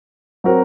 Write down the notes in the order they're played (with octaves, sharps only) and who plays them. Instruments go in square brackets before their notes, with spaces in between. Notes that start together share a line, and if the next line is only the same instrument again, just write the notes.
[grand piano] F#3 C4 F#4 A#4